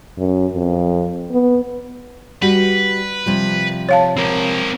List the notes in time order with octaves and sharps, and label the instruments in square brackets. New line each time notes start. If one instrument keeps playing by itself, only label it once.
[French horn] F#2
F2
B3
[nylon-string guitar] G3 F#4 [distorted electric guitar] B4
[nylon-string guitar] C3 F3 G3
[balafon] C#5 F5 A5
[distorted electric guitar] C4 A#4